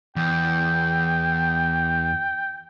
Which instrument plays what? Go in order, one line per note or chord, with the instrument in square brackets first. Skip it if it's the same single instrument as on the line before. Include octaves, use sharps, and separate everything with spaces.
[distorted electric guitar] E2 [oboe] G5